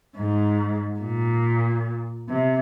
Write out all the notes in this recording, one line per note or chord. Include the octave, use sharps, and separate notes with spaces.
G#2
A#2
C3